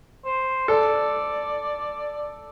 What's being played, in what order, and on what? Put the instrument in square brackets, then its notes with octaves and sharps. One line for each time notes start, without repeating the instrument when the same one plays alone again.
[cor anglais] C5
[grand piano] A4 [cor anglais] D5